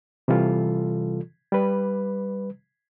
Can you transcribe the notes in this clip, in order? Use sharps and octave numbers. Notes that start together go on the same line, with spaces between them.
C3 E3 G3 F4 A4
G3 B4